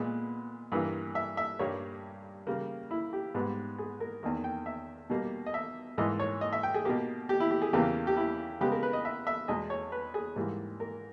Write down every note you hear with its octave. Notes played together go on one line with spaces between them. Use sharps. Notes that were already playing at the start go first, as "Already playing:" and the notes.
Already playing: A#2 G#3 B3
G2 E3 A#3
E5
E5
G2 G3 A#3 C#5
C#3 G3 A#3
E4
G4
G#2 G3 B3
G#4
A#4
E2 D#3 A#3
G5
E5
B2 G3 A#3
D#5
E5
G#2 E3 A#3 D#5
C#5
D#5
E5
G5
G#4
B2 A#3 G4
G4
E4
G4
G#4
E2 C#3 E3 A#3 G4
G4
E4
C#3 G#3 B3 G4
A#4
B4
D#5
E5
E5
E2 B2 G#3 D#5
C#5
B4
G#4
G#2 E3 G3 A#3
A#4